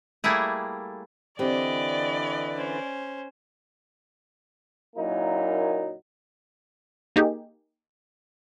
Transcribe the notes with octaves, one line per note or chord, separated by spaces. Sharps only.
G3 A3 A#3 E4 G#4
D3 E3 C4 G4 B4 D5 D#5
C#4 C5
F#2 A#2 F#3 A#3 D#4 E4
A#3 D#4 G4 G#4